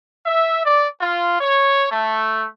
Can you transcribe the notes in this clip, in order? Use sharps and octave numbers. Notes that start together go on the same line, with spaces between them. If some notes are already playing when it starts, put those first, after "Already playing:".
E5
D5
F4
C#5
A3